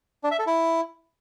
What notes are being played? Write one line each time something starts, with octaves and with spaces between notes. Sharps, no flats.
D4
E5
A4
E4